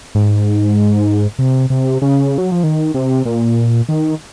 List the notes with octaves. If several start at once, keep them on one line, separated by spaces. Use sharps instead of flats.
G#2
C3
C3
C#3
F#3
F3
D#3
C3
A#2
D#3